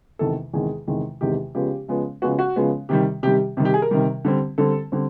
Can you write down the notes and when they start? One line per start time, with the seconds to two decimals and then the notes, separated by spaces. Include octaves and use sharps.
0.19 E2 C3 D#3 G#3 A4
0.53 E2 C3 D#3 G#3 G#4
0.87 E2 C3 D#3 G#3
1.21 E2 C3 D#3 G#3 G4
1.55 C#3 F3 G#3 B3 G4
1.88 C#3 F3 G#3 B3
2.22 C#3 F3 G#3 B3 F#4
2.39 F#4
2.56 C#3 F3 G#3 B3
2.89 C3 D#3 G3 G4
3.23 C3 D#3 G3 G4
3.57 C3 D#3 G3
3.65 G4
3.74 G#4
3.82 A#4
3.91 C3 D#3 G3
4.25 D3 G3 C4
4.58 D3 G3 C4 A4
4.92 D3 G3 C4